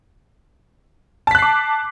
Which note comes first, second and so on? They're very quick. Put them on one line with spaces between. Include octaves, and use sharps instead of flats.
A5 B6 F#6 C7 D6